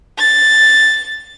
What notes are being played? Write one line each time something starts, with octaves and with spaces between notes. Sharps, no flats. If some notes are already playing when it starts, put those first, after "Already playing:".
A6